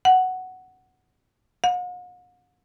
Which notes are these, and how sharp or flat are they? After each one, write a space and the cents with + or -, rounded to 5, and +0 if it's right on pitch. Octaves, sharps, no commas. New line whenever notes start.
F#5 +5
F#5 -45